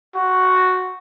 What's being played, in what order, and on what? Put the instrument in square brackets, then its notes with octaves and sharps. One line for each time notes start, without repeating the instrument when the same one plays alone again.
[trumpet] F#4